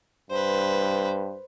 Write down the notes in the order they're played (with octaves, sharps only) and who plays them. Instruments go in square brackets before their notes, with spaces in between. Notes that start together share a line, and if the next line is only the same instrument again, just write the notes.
[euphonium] G2 [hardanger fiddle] B4 C5